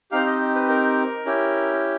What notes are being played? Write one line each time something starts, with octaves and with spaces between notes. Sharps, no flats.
C4 D#4 G4 F5
D#5
B4
A#4
C#4 E4 G4